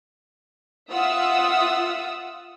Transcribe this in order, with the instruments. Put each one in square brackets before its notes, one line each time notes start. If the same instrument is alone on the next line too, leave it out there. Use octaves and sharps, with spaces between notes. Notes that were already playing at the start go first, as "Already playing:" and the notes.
[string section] F4 E5 F#5 D#6 E6